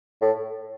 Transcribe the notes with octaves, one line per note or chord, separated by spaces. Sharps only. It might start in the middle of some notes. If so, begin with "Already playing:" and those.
A2